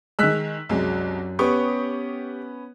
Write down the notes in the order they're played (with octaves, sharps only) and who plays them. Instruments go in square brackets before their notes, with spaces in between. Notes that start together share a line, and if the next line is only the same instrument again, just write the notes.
[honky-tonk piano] D#3 G#3 [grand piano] E6 F#6 B6
[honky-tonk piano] C2 G#3 [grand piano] F#2
[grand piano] B3 C#4 B4 [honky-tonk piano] G4 C#6 D#6